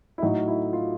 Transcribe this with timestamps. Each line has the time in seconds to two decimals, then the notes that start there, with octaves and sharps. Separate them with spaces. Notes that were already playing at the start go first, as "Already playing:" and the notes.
0.18 E4
0.22 A2 F#3 D#4
0.48 E4
0.73 F4